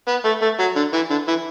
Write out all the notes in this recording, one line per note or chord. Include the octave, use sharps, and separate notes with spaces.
B3
A3
A3
F#3
D3
E3
D3
E3